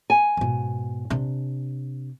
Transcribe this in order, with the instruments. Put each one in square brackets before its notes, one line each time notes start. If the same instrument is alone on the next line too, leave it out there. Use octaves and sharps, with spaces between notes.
[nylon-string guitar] G#5
[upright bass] G#2 B2
C3 D4